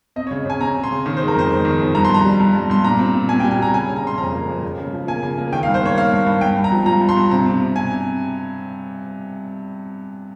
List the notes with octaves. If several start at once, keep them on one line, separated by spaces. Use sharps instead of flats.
C4 D#5
C#5
C#3
C#3 G#5
C4 A#5
C#3
C6
C#3
D#3
C5
G#3
A#4
F2 C5
F2
D#3
F2
G2 A#5
C6
G2 A#5
G3
G2
G2
G2 C6
A#2 A#5
C4
A#2
A#2 G#5
G5
G3
G#5
G3 A#5
C#3 G#5
C#3
A#5
C#3 C6
F2 A#5
A#3
F2
C#3
C#3
F3
A#3 G#5
C#3
A#3
D#3 G5
F5
G2
C5
A#3 C#5
A#3 F5
G2
G2
G2 G5
G2
A#5
F3
F3 A#5
G2
C6
G2
C3 A#5
C3
C3
C3 G#5
C3